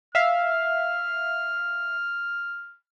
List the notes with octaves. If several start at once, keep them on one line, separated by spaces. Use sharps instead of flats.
E5 F5 F6